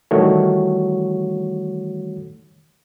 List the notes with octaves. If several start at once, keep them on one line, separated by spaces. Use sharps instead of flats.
D#3 E3 G3 A3 F#4 C#5